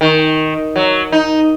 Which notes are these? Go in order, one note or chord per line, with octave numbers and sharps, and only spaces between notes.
D#3
F#3
D#4